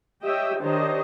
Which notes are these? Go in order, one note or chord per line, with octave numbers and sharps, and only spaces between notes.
G4 C#5 D#5 E5 G5
D#3 D4 G4 C5 C#5 D#5